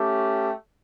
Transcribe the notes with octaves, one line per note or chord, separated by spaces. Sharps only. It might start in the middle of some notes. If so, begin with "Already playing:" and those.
Already playing: A3 C#4 G4